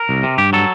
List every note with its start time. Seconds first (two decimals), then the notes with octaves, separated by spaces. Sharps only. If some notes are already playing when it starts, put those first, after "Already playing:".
Already playing: A#4
0.09 C2
0.23 C3
0.38 G2 G4
0.53 F#3 A4